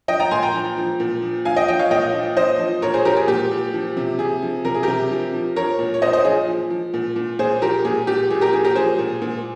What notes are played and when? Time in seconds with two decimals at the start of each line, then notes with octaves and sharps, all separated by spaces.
0.08 F3 D#5 G5
0.20 G5 A#5
0.31 A#2 G#5 C6
0.43 G5 A#5
0.54 F3
0.77 F3
1.00 A#2
1.22 F3
1.45 F3 F5 G#5
1.57 D#5 G5
1.68 F3 D#5 G5
1.79 C#5 F5
1.91 A#2 D#5 G5
2.14 F3
2.36 F3 C5 D#5
2.59 F3
2.82 A#2 A#4 C#5
2.94 G#4 C5
3.05 F3 G4 A#4
3.17 G#4
3.28 A#2 G4
3.51 A#2
3.74 F3
3.97 C3
4.19 C3 G#4
4.42 F3
4.65 C3 A#4
4.74 G#4
4.83 C3 G4 A#4
5.11 F3
5.33 F3
5.56 F3 A#4 C#5
5.79 A#2
5.94 C#5
6.01 A#2 C5 D#5
6.13 C5 D#5
6.25 F3 G#4
6.48 F3
6.71 F3
6.94 A#2
7.16 A#2
7.39 A#2 G#4 C5
7.62 F3 G4 A#4
7.85 A#2 G#4
8.07 A#2 G4
8.30 A#2 G#4
8.41 G4 A#4
8.53 F3 G#4
8.65 G4 A#4
8.75 F3 G#4 C5
8.99 A#2
9.22 A#2